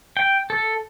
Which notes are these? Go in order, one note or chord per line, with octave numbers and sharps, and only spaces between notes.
G5
A4